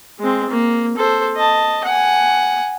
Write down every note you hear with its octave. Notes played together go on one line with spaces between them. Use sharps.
G#3 C4
A#3
A4 C5
D#5 A5
F#5 G#5